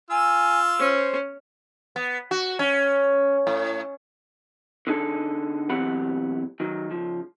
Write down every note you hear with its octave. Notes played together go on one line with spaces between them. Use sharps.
F4 G#5 E6
C#4 C5
B3
F#4
C#4
A2
D3 D#4 G#4 A4
B1 E3 C4 G4 F#5 B5
D#3 F#3
C#2 F3